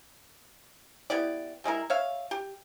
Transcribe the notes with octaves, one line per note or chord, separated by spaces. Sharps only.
B3 E4 G4 D5
G3 G#3 E4 A#4
C#5 E5 F5
G4